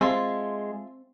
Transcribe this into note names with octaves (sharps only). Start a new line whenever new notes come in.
G#3 C4 F4 E5 A5 C6